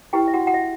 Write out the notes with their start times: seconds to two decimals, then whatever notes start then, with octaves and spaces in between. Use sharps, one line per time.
0.13 E4 G4 B4 G5
0.28 E5
0.34 F#4 F#5
0.47 F#5
0.54 E5